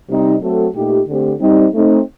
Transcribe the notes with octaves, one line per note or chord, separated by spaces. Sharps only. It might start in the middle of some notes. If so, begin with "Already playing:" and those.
C3 G3 C4 D#4
F#3 A3 C4 F#4 A4
A#2 A3 D#4 G4
D3 A3 C4 G4
G3 C4 D#4
A3 C4 D#4